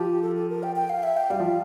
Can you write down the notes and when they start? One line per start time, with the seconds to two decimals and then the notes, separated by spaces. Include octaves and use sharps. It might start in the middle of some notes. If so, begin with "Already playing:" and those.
Already playing: F3 G4
0.22 A4
0.36 A4
0.50 A#4
0.63 G5
0.76 G5
0.89 F5
1.03 E5
1.17 G5
1.30 G3 F5
1.40 F3